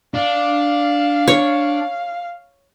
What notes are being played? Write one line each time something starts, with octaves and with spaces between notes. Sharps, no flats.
D4 F5
C#5